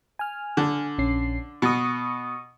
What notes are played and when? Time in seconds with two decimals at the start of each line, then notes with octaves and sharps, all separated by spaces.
0.19 G#5 F6
0.57 D3
0.98 A#1 C#4 C7
1.62 B2 C#6 D#6